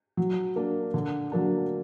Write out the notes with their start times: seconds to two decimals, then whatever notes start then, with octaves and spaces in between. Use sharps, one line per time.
0.17 F#3
0.56 A#3 D4
0.94 D3
1.32 F#3 A#3 D4